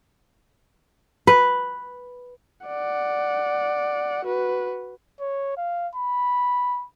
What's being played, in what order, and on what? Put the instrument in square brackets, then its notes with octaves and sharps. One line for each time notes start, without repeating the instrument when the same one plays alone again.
[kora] B4
[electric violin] D5 F#5
F#4 B4
[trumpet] C#5
F5
B5